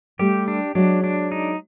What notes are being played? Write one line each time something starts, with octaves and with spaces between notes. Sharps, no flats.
G3 A3 G4
D4
F#3 G#3 D4
D4
D#4